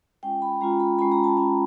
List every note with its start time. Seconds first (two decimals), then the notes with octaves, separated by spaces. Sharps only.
0.23 G#3 C#4 F4 G5
0.42 B5
0.61 G#3 C#4 F4 A#5
0.80 B5
0.99 G#3 C#4 F4 B5
1.12 A#5
1.24 A5
1.37 G#3 C#4 F4 A5